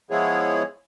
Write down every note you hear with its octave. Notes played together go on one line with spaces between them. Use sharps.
F3 G#3 B3 E4 G#4 C#5